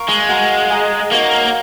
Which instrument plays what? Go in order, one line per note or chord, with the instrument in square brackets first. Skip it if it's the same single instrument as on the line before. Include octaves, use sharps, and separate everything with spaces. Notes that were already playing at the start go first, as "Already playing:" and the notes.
Already playing: [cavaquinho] A#4 F5 C#6
[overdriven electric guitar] G#3
[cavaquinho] F#4 A#4 F5
G#4 D#5 A#5
[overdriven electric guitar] A#3 [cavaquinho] D#4 F#4 C#5